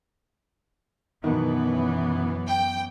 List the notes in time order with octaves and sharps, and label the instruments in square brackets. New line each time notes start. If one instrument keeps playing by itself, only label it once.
[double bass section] F#2 E3 B3 [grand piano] B2 D#3
[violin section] G5